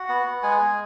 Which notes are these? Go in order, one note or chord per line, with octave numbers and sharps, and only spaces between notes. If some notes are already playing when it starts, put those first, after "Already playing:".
Already playing: F#4 F#5
B3
B3
G#3 G#4 G#5
G#3